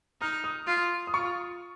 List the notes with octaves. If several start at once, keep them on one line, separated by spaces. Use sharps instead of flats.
D#4 F6
D#6
F4
D#6
F4 C#6